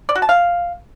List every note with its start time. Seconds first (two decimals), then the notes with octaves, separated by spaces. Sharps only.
0.09 D5
0.15 F#4
0.22 A5
0.29 F5